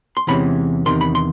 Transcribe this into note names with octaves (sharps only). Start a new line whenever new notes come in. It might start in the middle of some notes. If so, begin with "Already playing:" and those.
C6
E2 C3 E3 G#3 C#4 B5
E2 C3 D#3 C6
B5
C6